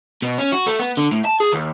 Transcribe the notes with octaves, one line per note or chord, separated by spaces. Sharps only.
B2
C#4
F#4
A3
B3
D3
A2
A5
G#4
D#2